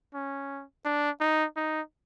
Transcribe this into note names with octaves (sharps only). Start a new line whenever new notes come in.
C#4
D4
D#4
D#4